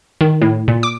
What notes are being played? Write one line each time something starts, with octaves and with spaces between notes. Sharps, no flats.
D#3
A2
A#2
D6